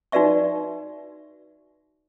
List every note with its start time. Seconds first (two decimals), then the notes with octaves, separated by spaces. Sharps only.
0.12 D#4 F#4 B4 D5 E5 C#6